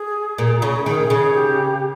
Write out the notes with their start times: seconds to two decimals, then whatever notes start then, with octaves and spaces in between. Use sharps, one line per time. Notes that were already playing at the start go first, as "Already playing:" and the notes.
Already playing: G#4
0.38 A#2
0.62 C#3
0.86 D#3 G#4
1.10 C#3
1.35 G4